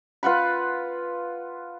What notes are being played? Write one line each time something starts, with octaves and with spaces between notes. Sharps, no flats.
F4 B4 F#5 B5